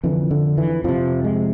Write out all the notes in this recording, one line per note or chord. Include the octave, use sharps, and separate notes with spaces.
F2 D3 E3
D3
E3
F2 C3 F3
G#3